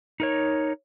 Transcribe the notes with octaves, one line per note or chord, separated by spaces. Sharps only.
D#4 A#4 C#5